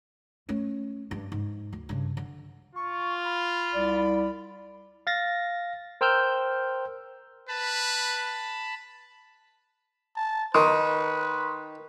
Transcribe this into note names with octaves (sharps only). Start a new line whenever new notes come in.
A3 C#4
G2
G#2
D2
G2 C#3
D3
F4 C#6
B5
C2 D5
F5 A6 A#6
A#4 C5 G5 E6 F6 G6
B4 A5 B5
A5
D#3 B4 C6 C#6 D#6